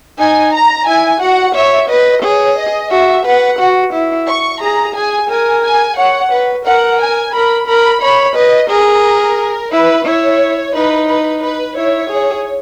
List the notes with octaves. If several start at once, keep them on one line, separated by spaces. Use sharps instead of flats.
D#4 G#5
A#5
E4 G#5
F#4 F#5
C#5 E5
B4 D#5
G#4 C#5
D#5
F#4 E5
B4 F#5
F#4
E4
C#6
G#4 A#5
G#4 G#5
A#4 G#5
G#5
C#5 F#5
B4
A#4 F#5
G#5
A#4 B5
A#4 B5
C#5 B5
B4 D#5
G#4 A#4
E4 B4
E4 C#5
D#4 B4
B4
B4
E4 C#5
G#4